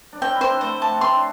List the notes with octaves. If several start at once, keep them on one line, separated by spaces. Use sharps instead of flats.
D4
C4 G5
E4
C5
D4
A3 C5
A5
A3
C4 C6
D4